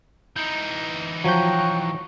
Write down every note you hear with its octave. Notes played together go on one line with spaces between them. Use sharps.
E3 D#4 G6
F3 F#3 C#5 G5 C#6 F#6 G6